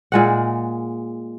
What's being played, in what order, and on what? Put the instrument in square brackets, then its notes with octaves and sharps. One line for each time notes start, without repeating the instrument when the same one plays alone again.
[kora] A#2 G#3 F#5